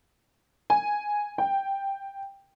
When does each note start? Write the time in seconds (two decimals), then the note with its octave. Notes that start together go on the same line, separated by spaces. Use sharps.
0.70 G#5
1.38 G5